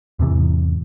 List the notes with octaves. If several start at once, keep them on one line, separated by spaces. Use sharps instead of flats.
E2 G#2 C3 E3